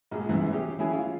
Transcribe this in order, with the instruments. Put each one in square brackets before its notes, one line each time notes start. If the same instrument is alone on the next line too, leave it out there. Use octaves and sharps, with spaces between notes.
[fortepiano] A#1 G#3
C2 G#2 C#3 E3 B3
F#3 C#4 G4 G#4
E3 C#4 E4 G#4 G#5
F4